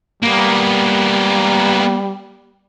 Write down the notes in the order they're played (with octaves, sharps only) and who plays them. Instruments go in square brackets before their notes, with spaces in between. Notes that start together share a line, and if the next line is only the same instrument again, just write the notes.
[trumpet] G3 [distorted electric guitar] A#3 B3